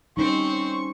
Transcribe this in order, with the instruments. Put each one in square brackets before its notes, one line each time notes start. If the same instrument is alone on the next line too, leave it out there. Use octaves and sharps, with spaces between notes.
[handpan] G3 D#4 [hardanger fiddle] C4 C5 [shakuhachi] C#4 [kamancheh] C#6